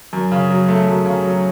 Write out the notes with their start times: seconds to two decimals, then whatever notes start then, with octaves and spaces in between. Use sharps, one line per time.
0.13 F#2
0.32 C#3
0.50 F#3
0.68 A3
0.87 F#2
1.06 C#3
1.24 F#3